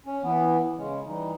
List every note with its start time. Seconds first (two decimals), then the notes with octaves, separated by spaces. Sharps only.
0.06 C#4
0.23 E3 B3
0.78 C#3 G#3 C#4
1.07 E3 G3 D#4